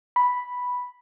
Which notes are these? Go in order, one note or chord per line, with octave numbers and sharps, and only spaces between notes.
B5